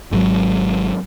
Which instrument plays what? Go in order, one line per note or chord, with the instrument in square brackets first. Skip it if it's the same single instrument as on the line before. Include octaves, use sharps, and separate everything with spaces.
[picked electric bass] G#1 G#2 D#3 F#3